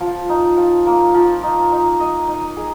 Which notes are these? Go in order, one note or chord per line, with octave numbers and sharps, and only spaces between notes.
F3
D#4
F3
A#3
F3
D#4
D#4
D#5
D#4
G#4